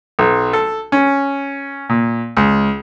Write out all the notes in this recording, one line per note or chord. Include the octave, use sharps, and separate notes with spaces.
B1
A4
C#4
A#2
C#2